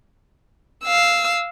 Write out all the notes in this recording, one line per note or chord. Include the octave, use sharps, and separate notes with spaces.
F5 E6